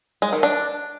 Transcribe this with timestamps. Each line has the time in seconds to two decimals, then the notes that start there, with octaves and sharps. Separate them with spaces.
0.22 G#3
0.33 D#3
0.43 D4